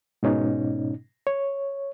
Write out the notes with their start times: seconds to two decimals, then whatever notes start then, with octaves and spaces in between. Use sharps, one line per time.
0.23 G#2 B2 C#4 D#4
1.27 C#5